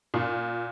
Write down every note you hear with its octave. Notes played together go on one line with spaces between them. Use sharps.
A#2